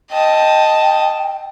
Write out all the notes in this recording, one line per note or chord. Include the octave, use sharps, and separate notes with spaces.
D#5 G5 A5